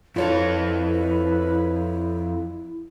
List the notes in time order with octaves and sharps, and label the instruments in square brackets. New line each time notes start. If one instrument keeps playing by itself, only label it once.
[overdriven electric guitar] F2 A4 [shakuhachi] E4 [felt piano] F4 C#5 [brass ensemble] B4